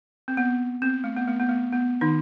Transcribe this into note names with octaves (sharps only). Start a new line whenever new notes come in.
C4
B3
C4
A3
B3
A3
B3
A3
B3
D#3 D#4